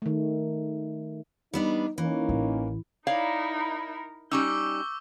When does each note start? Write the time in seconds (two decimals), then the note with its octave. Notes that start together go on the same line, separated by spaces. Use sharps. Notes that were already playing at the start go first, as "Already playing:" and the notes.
0.02 D#3 A3
1.54 G3 B3 D4 D#4
1.98 E3 A#3 C#4 D#4
2.29 A1
3.07 D#4 E4 A#4 C#5 D5 F5
4.32 G3 C#4 D#4 C#6 D6 E6 G6